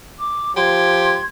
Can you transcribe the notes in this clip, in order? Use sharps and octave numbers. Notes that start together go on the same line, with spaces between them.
D6
F3 G4 C6 G#6